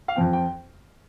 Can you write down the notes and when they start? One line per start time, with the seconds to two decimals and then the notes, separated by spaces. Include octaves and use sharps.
0.08 F5
0.16 F2 F3 C4 G5
0.33 G5